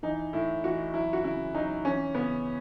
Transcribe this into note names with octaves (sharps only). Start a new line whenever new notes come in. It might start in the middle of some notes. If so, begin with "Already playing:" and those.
E3 D#4
A2 E4
E3 F#4
F#3 E4
F#4
C#3 E4
F#3 D#4
E3 C#4
C#3 B3